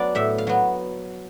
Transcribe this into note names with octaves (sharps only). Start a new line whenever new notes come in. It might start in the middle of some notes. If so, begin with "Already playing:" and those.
Already playing: F#3 B3 D4 D5
A2 E5
F5
F#3 B3